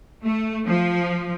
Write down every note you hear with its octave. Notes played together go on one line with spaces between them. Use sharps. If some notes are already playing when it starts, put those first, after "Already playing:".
A3
F3